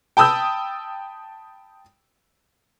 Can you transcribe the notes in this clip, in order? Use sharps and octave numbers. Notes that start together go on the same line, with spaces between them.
G5 A5 B5 D#6 E6 G6